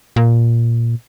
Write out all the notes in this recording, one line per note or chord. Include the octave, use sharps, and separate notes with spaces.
A#2